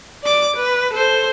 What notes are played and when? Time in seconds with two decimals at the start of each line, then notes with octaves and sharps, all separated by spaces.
0.23 D5 D6
0.56 B4
0.93 A4 C5